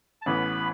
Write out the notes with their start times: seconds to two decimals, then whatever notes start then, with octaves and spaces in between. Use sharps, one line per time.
0.22 A5
0.26 A1 A2 E3 B3 B4 B5